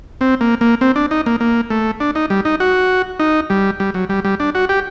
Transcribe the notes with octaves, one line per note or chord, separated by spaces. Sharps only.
C4
A#3
A#3
C4
D4
D#4
A#3
A#3
A3
D4
D#4
G3
D#4
F#4
D#4
G3
G3
F#3
G3
G3
D4
F#4
G4